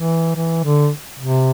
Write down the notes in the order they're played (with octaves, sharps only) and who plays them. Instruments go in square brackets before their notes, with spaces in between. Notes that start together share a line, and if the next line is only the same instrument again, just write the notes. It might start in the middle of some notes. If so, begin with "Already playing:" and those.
Already playing: [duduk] E3
E3
D3
C3